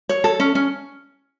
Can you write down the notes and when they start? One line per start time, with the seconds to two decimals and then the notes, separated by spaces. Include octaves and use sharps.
0.09 C#5
0.24 A4
0.40 C#4
0.55 C#4